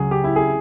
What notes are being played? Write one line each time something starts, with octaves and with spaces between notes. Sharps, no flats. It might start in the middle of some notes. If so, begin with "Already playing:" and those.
Already playing: C#2 C#3 F#3 G#4
G4
E4
G#4